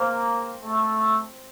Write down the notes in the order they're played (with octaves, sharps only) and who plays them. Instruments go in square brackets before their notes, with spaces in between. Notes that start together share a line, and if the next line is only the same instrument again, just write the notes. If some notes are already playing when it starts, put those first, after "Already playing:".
Already playing: [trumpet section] A#3 [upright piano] C4
[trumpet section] A3